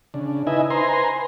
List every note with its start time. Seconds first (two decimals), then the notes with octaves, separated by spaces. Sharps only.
0.14 C#3 D4
0.47 D#4 E4 B4 D#5 E5 G#5
0.70 B4 C5 G#5 A#5 C6